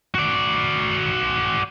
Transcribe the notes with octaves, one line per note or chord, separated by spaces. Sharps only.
F#4 D5